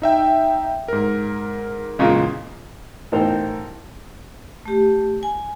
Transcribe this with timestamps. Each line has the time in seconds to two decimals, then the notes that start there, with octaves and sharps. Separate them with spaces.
0.02 D#4 E5 G5
0.88 G#2 A#4
1.99 E2 A#2 C#3 G#3
3.12 A1 B2 D#4 A#4 C5 G5
4.66 A3 G4
5.23 G#5